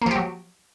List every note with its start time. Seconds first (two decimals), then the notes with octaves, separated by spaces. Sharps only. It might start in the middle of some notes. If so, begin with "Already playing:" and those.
0.02 A#3
0.06 F3
0.11 G4
0.16 F#3